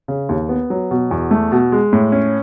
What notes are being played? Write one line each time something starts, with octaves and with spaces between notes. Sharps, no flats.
C#3
D#2
B3
F#3
B2
E2
A3
B2
G#3
A2
C#4